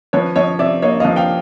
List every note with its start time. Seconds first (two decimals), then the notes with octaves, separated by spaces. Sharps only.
0.13 F3 B4 C#5
0.36 F3 C#5 D#5
0.59 C3 D5 E5
0.82 A#3 C#5 D#5
1.00 D#5 F5
1.05 F3
1.16 F5 G5